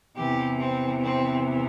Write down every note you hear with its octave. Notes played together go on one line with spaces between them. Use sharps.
E2 C3 E3 G4
C4
C4